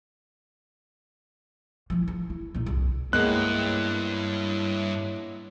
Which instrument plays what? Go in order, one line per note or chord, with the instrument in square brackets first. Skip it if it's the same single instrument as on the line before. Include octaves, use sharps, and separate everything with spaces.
[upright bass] F3 E4
F3
E4
A#1 D#4
C2 F2
[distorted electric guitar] G2 [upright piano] G#3 A#3 B3 [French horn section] E4 C#5 [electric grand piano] F#6